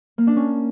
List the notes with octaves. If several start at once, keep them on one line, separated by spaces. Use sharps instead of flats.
A#3
D4
C#4